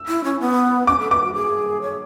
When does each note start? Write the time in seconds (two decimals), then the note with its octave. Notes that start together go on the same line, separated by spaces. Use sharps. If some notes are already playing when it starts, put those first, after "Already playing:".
Already playing: E6
0.09 E4
0.24 C#4
0.40 B3
0.87 C#4 D6
0.99 A4
1.11 B4 D6
1.24 F#4
1.34 G#4
1.82 C#5